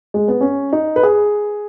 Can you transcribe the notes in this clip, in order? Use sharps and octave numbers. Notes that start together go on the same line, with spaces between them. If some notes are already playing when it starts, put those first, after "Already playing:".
G#3
B3
C#4
D#4
B4
G#4